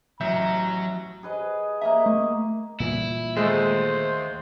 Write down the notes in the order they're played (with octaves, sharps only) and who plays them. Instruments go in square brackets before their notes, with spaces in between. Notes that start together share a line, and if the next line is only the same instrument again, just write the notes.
[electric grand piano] A1 E5 G6 [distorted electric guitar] F#3 [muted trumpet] A#5
[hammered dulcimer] G#4 B4 D#5
[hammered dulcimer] A#3 D#5 A#5 [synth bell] E5
[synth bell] A3
[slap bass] A#2 E3 G3 [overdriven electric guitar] E4
[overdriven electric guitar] D#2 [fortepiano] G#3 A3 [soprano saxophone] C5